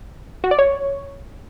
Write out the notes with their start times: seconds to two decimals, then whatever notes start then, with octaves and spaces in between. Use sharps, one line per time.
0.44 F#4
0.51 D5
0.59 C#5